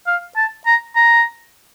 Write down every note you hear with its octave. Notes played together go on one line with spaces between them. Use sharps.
F5
A5
A#5
A#5